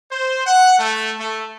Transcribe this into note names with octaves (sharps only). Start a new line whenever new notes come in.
C5
F#5
A3
A3